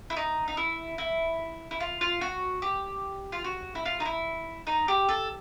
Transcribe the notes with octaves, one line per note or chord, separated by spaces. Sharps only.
E4
D#4
D#4
E4
E4
E4
F4
F4
F#4
G4
F4
F#4
E4
F4
D#4
E4
D#4
G4
A4